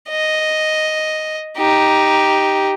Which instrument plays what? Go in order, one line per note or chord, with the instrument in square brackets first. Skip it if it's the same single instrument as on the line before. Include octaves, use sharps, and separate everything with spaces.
[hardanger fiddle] D#5
D#4 G4